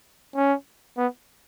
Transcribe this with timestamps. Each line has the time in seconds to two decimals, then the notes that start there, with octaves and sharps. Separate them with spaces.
0.36 C#4
0.98 B3